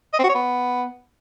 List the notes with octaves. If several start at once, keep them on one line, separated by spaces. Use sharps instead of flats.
D#5
C4
F#4
C#5
B3